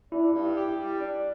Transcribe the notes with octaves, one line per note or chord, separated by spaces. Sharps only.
D4 E4
G2 E4
G4
G3
D4